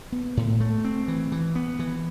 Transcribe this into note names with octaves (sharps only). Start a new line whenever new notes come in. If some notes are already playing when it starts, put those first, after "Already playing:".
B3
A2
A3
C4
E3
E3
B3
E3